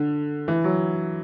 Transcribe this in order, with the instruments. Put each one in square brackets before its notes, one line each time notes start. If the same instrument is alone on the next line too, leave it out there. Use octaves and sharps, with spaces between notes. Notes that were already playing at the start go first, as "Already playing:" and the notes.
Already playing: [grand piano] D3
E3
F#3